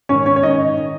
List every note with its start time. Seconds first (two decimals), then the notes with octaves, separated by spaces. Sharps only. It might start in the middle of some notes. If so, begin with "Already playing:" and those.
0.09 G#2 D#3 C#4 C#5
0.26 C#4 C#5
0.36 C#5
0.43 G#2 D#3 D#4 D#5
0.77 D#3